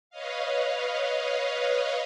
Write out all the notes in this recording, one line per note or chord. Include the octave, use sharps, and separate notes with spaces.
B4 C#5 D#5 F5